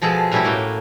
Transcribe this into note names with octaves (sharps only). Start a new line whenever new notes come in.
B2 F3 G#3 G#4 A4
B2 G3 A3 C#4 E4 G4
A2 A#3 F#5 G5